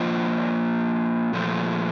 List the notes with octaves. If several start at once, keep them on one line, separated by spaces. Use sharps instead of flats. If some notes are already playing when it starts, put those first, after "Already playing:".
Already playing: F3 A#3 F4 C5 D#5
A#2 F3 A3